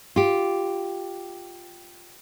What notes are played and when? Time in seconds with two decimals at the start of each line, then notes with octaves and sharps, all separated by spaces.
0.16 F4 G4